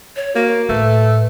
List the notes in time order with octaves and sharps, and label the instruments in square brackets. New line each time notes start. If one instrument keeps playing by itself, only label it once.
[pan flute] C#5
[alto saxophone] A#3 [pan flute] F#4
[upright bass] A2 [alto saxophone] A3 [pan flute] B4